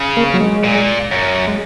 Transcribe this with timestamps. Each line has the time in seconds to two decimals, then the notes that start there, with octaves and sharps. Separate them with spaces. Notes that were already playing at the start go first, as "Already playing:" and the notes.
Already playing: C#3
0.17 A#3
0.34 F#3
0.40 G#3
0.63 A#2
1.11 F#2
1.47 G#3